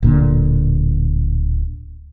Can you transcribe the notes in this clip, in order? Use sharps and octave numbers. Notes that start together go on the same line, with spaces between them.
D1 A#2 D3